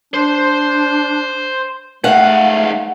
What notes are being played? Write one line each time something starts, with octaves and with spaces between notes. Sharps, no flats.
D4 C5 C6
G#2 A3 F5 F#5